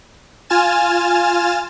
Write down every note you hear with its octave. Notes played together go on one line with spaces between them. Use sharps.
F4 G#5 F6 A6 E7